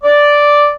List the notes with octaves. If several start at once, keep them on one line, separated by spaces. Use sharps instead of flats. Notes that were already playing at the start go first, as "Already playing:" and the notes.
D5